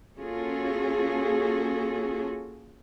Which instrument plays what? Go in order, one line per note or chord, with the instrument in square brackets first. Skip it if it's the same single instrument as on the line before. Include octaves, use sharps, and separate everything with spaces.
[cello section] A#3 C#4 F4 F#4 G#4 A4